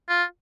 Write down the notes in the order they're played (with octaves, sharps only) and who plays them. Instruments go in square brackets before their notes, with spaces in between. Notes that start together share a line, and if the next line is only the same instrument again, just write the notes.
[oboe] F4